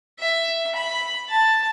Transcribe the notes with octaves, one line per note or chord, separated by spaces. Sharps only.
E5
B5
A5